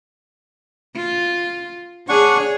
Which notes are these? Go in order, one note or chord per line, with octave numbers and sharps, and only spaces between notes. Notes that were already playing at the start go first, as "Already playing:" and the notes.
F4
D4 G#4 C#5 F#5 C#6